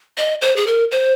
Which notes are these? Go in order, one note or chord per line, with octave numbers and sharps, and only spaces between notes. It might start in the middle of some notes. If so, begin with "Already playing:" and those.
D#5
C5
G#4
A#4
C5